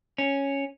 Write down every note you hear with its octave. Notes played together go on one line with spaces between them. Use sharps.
C#4